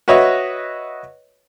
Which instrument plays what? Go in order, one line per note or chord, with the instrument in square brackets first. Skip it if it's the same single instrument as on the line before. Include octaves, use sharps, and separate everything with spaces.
[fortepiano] F#4 B4 C#5 D#5 E5